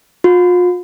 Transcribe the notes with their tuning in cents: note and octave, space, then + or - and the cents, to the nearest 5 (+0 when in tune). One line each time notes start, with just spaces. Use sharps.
F4 +40